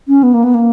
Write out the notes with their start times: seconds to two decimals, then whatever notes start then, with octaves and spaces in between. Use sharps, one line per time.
0.08 C#4
0.23 B3
0.34 A#3
0.44 B3
0.54 A#3